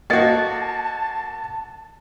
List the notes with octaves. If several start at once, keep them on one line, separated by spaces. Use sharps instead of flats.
A#3 F#4 A4 D#5 G5 A5